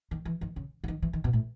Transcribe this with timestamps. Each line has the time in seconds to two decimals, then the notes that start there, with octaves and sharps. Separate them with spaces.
0.11 D#3
0.25 E3
0.41 D#3
0.56 C#3
0.84 D3
0.88 D#3
1.02 E3
1.13 D#3
1.24 B2
1.33 A2